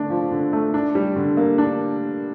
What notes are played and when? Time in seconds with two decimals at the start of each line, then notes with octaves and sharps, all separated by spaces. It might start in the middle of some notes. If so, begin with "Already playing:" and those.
Already playing: D3 A3 D4
0.10 F3
0.31 D3
0.53 A3
0.74 D4
0.95 G3
1.16 D3
1.37 A#3
1.58 D4